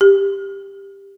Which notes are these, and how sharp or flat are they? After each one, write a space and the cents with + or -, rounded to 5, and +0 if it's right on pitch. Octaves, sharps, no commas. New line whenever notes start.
G4 +10